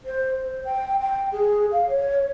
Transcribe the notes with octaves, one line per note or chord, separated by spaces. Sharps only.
C5
C5
G5
G5
G#4
F5
C#5